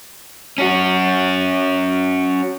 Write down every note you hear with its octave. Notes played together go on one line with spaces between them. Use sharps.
C#4 F#4